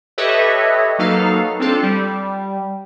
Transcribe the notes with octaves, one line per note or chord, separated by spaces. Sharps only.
G4 A4 B4 C#5 D#5 E5
F#3 A#3 D#4 A4 B4 F5
C4 D4 F4 A4
G3